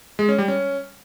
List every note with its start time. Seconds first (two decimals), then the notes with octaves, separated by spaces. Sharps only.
0.19 G#3
0.29 C#4
0.38 G3
0.48 C#4